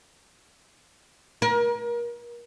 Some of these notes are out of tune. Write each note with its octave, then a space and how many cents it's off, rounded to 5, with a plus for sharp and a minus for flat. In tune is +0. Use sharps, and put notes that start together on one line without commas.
A#4 +35